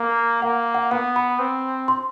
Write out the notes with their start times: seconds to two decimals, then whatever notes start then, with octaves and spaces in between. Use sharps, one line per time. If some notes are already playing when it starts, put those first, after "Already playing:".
Already playing: A#3
0.42 A#3 F#5
0.75 F#5
0.91 B3 F#5
1.16 B5
1.39 C4
1.88 C6